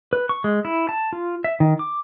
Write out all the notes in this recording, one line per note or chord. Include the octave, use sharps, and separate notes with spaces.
B4
C#6
G#3
E4
A5
F4
E5
D#3
D6